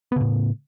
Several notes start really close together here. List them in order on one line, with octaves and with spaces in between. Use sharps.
B3 C#3 A2